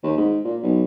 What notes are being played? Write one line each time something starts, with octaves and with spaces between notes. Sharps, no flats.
D#2
G#2
A#2
B1